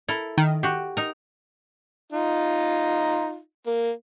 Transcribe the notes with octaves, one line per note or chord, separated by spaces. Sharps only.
E4 A4 A#4
D#3
F#4 G4
D#4 A#4
D#4 F4
A#3